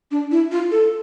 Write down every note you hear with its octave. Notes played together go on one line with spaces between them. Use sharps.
D4
E4
F4
A4